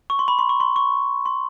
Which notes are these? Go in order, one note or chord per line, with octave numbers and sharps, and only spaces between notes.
C#6
C6
B5
C6
C#6
C6
C#6
C6